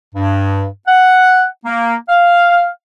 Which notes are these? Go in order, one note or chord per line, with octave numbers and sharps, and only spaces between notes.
G2
F#5
A#3
F5